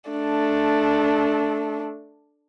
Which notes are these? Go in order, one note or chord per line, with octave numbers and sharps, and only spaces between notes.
A3 D4